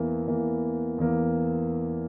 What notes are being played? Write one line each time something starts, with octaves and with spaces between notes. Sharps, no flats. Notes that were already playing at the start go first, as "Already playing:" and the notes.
Already playing: E2 E3 A#3
E2 E3 A#3
E2 E3 A#3